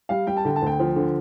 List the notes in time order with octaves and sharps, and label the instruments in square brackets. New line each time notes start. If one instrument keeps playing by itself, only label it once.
[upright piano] G3 F5
G3 G5
A5
D3 G5
A5
D2 G5
F3
D3